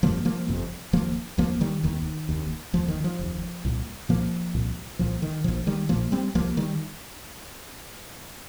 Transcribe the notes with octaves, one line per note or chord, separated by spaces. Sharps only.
G1 F2 C3 F3 A#3
F3 A#3
G1 F2 C3
F1 D#2 F3 A#3
F1 D#2 F3 A#3
D#3 G3
F1 D#2 D#3
F1 D#2
F1 D#2 F3
D#3
F3
F1 D#2
C2 A#2
C2 A#2 F3 A#3
C2 A#2
C2 A#2 F3
D#3
A#1 A#2 F3
D#3 G3
A#1 A#2 F3 A#3
G3 C4
C2 C3 F3 A#3
D#3 G3